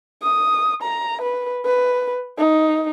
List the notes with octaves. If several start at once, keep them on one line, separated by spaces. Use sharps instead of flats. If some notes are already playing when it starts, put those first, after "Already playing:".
D#6
A#5
B4
B4
D#4